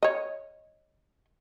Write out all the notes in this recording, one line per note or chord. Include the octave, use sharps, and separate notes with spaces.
C#5 D#5